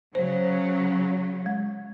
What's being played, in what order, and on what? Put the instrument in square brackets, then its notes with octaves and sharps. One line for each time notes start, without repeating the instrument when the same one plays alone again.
[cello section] C#3 F#3 [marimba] C5
[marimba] G#3